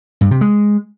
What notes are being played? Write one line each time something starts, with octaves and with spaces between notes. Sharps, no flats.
G2
C3
G#3